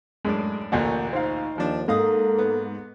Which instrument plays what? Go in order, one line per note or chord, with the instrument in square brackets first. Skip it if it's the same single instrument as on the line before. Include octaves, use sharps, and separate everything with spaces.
[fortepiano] F#2 A2 D4 [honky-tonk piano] G#3
[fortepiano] A1 D2 A#2 [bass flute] A#3 [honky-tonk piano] F#5 G6
[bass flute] D#4 [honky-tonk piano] C5 F5
[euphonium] D#2 [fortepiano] F3 D4
[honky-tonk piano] G#2 [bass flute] A#3 [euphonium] A4 [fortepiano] D#5 F5 D#6
[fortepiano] B3